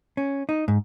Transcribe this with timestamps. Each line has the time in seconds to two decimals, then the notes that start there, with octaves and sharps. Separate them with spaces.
0.17 C#4
0.49 D#4
0.68 G#2